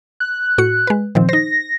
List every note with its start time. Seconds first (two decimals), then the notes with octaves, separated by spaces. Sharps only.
0.20 F#6
0.58 A2 F#4 C#7
0.87 G#3 B4
1.15 A#2 D#3 F3 C4
1.29 D#4 C5 A#6